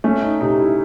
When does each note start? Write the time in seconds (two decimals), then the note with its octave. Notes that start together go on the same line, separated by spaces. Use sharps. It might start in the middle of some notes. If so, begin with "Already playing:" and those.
0.04 A3 C#4
0.23 D#4
0.41 C3 D#4
0.59 E4